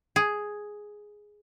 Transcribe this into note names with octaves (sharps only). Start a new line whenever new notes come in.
G#4